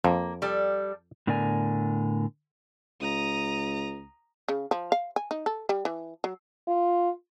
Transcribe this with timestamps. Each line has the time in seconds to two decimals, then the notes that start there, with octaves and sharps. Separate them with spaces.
0.04 F2 A#3
0.42 G3 A4
1.27 A2 D3 B3 A#4 D5 G#5
3.01 C#2 A#5 D#6
4.48 C#3
4.71 F3
4.92 F5
5.16 G#5
5.31 D#4
5.46 A4
5.69 G3
5.85 E3
6.24 F#3
6.67 F4